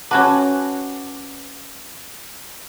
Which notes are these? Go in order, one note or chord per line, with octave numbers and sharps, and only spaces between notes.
C#4 F#4 B4 F#5 A5 D6